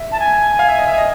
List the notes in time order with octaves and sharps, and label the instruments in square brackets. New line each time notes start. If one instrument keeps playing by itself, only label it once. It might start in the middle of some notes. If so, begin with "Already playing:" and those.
Already playing: [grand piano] E5
[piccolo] A5
G#5
[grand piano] F5
E5
D#5
E5
D#5